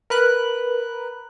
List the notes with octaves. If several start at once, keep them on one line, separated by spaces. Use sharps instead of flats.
A#4 B4 F#6